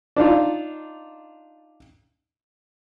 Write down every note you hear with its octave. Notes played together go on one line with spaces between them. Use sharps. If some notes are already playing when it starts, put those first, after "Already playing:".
D4 D#4 F4